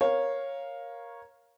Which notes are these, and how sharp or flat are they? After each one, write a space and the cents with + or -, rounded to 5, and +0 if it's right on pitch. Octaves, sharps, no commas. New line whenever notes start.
A#4 +10 C#5 -10 F5 +0